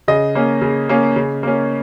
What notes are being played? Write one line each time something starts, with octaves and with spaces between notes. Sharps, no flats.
C#3 D#5
A#3 C#4
C#3
A#3 C#4
C#3
A#3 C#4